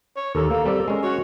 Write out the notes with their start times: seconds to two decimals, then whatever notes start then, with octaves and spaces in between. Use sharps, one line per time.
0.17 C#5
0.35 D#2 A4 A#4
0.51 A#3 A4
0.65 G3 C4 D5
0.88 G#3 C#4
1.03 F#4 C#5